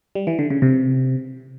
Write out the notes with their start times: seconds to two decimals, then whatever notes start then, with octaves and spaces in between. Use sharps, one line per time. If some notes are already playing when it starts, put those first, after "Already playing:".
0.15 G3
0.27 E3
0.39 D3
0.50 C#3
0.62 C3